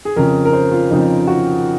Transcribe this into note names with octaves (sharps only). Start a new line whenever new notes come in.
G#4
F2 C#3 F3 A#4
A#4
C5
F4
F2 C#3 F3 D#4
F#4